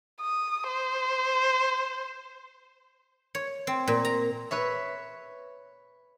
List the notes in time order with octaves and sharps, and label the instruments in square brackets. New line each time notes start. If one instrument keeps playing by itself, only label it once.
[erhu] D#6
C5
[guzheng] C#5
C4
A#2
A#5
B4 C#5 E5